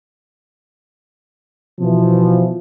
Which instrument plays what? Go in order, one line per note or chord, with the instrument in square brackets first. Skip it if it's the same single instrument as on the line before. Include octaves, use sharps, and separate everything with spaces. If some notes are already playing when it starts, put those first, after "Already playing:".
[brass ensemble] B2 E3 F3